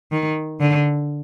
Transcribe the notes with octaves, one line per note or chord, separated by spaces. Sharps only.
D#3
D3